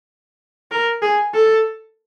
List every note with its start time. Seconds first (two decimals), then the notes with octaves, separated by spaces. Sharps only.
0.71 A#4
1.03 G#4
1.34 A4